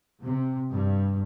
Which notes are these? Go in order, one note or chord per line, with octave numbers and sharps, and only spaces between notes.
C3
G2